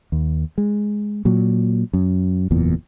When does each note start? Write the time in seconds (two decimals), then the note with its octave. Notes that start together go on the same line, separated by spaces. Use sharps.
0.12 D#2
0.58 G#3
1.25 A#2 F#3
1.93 F#2
2.51 F#1 E2 A#2